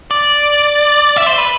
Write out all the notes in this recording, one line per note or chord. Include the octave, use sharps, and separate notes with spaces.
D5
E5
C5
B4